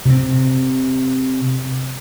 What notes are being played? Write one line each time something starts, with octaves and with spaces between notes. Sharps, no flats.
C3 C4